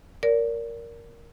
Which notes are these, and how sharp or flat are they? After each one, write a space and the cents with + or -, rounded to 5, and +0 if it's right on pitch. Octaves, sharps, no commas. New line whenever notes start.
A#4 +0 D5 -30